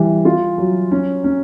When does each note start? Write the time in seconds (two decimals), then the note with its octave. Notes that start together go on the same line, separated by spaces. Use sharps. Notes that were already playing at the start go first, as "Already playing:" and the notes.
Already playing: E3 G3
0.25 F4
0.58 F#3
0.91 C#4
1.24 C#4